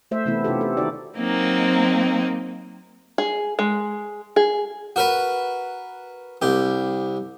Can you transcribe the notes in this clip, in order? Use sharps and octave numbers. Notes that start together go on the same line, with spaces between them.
A3 C5 E5
C3 E3 A3 B3 E4
C3 C#4 D#4 F4 G4 A4
A4
D#3 D#4 F#4 D5
F#3 A#3 C4 D#4
G#4
G#3
G#4
F#4 A#4 B4
C2 G4